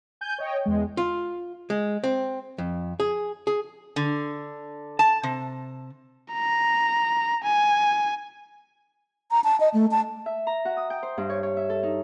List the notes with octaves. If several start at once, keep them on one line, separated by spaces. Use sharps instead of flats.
G#5 G6
C#5 D#5 G5
E2 G#3
F4
G#3
C4
F2
G#4
G#4
D3
A5
C3
A#5
G#5
A#5
A5
D#5
A3
A5
E5
A#5
F#4
D#6
G5
C5
G2
C#5
C#5
E5
A4
D#4